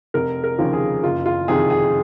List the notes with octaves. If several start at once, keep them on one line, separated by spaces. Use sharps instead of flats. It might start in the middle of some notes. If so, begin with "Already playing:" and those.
F1 A#4
A#4
D#2 C#3 F3
G#4
F#1 F4
F4
F2 C3 D#3 G#4
G#4